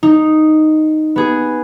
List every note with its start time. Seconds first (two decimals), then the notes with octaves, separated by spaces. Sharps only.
0.03 D#4
1.16 B3 G#4